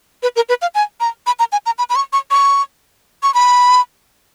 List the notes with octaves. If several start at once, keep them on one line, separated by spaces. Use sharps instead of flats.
B4
A#4
B4
F5
G#5
A#5
B5
A#5
G#5
A#5
B5
B5
C#6
C#6
C#6
C#6
B5